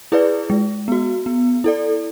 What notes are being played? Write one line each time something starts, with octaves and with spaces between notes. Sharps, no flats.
E4 G#4 B4 D5
G#3
B3 F#4
B3
E4 A4 D5